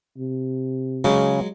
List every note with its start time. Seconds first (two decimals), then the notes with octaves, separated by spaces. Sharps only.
0.18 C3
1.04 C#3 F#3 G#3